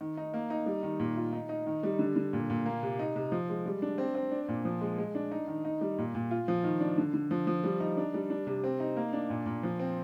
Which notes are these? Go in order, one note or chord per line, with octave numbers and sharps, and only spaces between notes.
D#3
D#4
A#3
D#4
G3
D#3
A#2
F4
D#4
D#4
D#3
G3
D3
D3
A#2
A#2
A#3
C3
D#4
C3
F3
G#3
G3
D4
C4
C4
D4
A#2
F3
G#3
G#3
D4
D#4
D#3
D#4
G3
A#2
A#2
F4
F3
D#3
D4
D3
D3
F3
F3
G3
D#4
D4
G3
D4
C3
C4
D#4
A#3
D4
A#2
A#2
F3
C4